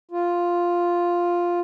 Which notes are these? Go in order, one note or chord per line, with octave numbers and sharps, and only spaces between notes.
F4